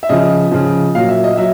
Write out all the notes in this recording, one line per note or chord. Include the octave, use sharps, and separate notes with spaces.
E5
C#3 F3 D#5
C#3 F3
A#2 F#3 F5
E5
D#5
F#3 E5